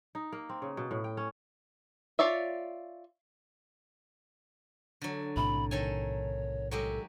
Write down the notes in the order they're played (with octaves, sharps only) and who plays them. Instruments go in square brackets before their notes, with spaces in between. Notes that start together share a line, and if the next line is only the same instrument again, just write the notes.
[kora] D#4
A#3
C4
C#3
B2
A2
G5
C#4
[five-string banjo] F4 C#5 D5 E5
[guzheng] D3 F#3
[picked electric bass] B1 A2 C3 [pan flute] B5
[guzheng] D#3 A4 G#5 [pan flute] C#5
[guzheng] F#3 G#3 G4 [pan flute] A4